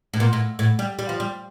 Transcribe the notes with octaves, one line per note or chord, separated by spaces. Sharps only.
A2
A#2
A2
A2
G3
G3
F3
G3